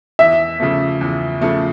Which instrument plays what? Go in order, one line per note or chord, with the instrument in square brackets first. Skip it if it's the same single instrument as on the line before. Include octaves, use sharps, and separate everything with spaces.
[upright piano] E2 [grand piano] E5
[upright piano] C#3 F3 A3
E2
C#3 F3 A3